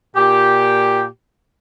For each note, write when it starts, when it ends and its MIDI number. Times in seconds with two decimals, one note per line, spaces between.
0.16 1.05 46
0.16 1.05 67